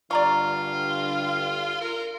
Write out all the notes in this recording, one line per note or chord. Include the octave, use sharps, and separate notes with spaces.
G2 D3 F4 D5 A#5 C#6
A#4